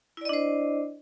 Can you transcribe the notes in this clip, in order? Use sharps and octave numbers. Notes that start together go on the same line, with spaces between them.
D4 E4 C5 D5 D#5